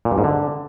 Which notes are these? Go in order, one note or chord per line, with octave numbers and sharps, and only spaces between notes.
A#2
G2
G#2
D3